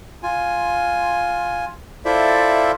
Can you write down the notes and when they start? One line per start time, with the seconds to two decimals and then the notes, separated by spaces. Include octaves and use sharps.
0.23 F4 G#5
2.05 E4 F4 A4 C5 D5 E5